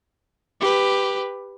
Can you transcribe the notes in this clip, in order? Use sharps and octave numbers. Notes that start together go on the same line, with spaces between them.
G4 B4